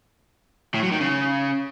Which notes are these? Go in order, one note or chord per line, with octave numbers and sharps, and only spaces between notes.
A2
F#3
D#3
C#3